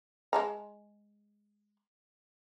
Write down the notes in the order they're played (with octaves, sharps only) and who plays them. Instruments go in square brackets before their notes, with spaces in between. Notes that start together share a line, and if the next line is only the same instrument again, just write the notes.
[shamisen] G#3 A5 A#5